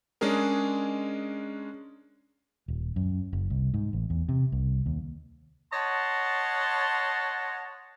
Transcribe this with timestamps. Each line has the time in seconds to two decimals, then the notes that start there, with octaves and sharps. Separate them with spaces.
0.21 G#3 C#4 D4 G#4 A#4
2.68 D#1
2.96 F#2
3.33 F#1
3.50 C2
3.74 G#2
3.93 A1
4.10 E2
4.29 C3
4.52 C2
4.86 D#2
5.73 C#5 D#5 F#5 A5 C6